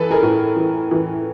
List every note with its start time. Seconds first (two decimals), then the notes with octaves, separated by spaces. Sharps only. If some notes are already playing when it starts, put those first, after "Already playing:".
Already playing: E3 A4 B4
0.11 G#4 A#4
0.22 A2
0.56 E3
0.91 E3